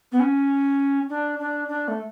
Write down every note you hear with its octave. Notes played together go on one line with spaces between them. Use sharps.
B3
C#4
D4
D4
D4
A3